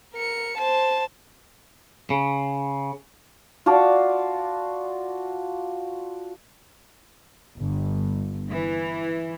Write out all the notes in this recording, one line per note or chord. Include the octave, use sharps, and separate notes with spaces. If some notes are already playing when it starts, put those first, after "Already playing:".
A#4 C#7
C5 A5
C#3
F4 F#4 D5 A5
G1
E3